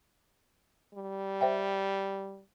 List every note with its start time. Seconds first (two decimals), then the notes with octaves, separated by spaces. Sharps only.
0.94 G3
1.41 C5 E5 G5